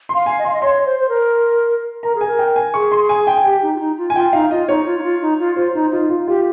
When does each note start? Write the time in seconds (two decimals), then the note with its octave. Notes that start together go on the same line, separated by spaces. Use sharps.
0.09 C6
0.15 F5
0.26 G#5
0.39 D#5
0.45 F5 C6
0.54 D#5
0.62 C#5 C6
0.86 C5
1.00 C5
1.09 A#4
2.03 A#4 A#5
2.15 G#4
2.21 G#5
2.27 A#4
2.39 G5
2.56 G#5
2.74 G#4 C#6
2.92 C6
3.09 G#5
3.27 G5
3.37 G#5
3.44 G4 G5
3.63 D#4
3.75 F4
3.80 D#4
3.98 F4
4.10 G#5
4.15 F4 G5
4.33 D#4 F5
4.51 F4 D#5
4.68 D#4 C#5
4.86 F4
4.99 D#4
5.03 F4
5.21 D#4
5.39 F4
5.56 F4 C5
5.74 D#4 C5
5.92 D#4 F4
6.10 F4
6.27 F4 G4